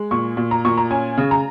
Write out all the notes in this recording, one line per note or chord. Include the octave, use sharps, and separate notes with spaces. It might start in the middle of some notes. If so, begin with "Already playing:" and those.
Already playing: G#3
A#2 C#6
A#2
A#5
A#2 C#6
A#5
C#4 G#5
C#3
A#5